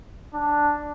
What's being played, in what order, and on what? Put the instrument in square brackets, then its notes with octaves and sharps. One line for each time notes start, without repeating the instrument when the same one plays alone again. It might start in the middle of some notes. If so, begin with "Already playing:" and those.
[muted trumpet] D4